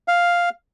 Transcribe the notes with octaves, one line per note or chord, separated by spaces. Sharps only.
F5